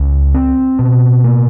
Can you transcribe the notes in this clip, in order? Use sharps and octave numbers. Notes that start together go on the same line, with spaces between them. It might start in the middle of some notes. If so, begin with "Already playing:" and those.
Already playing: C#2
C4
B2
A#3